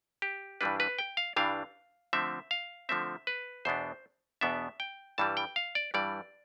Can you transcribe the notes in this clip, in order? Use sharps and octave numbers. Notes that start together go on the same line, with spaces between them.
G4
G2 E3 G3 D4 B4
B4
G5
F5
G2 E3 G3 D4 F5
D3 F3 A3 C4 E5
F5
D3 F3 A3 C4 E5
B4
E2 B2 B3 D4 C5
E2 B2 B3 D4 E5
G5
G2 E3 G3 A5
G5
F5
D5
G2 E3 G3 D5